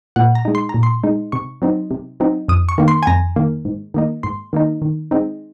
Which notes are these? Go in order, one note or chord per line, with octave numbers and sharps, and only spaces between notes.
A#2 F#5
A#5
G#3 D#4
C6
A#2 A#5
C6
G#3 D#4
C3 C#6
F#3 C4 D#4
C3
F#3 C4 D#4
F2 D#6
C#6
D#3 A#3
C6
G#5
F2 A#5
D#3 A#3
G#2
D#3 A#3 D#4
G#2 C6
D#3 A#3 D#4
D#3
G#3 C4 D#4